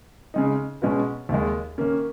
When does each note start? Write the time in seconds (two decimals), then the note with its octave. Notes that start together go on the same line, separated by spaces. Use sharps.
0.34 C#3 G#3 D#4
0.82 B2 G#3 C#4 F#4 B4
1.29 D#2 D#3 G#3
1.78 D#3 A#3 C#4